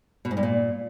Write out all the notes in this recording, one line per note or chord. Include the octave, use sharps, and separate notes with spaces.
B2
G#2
G2
A#2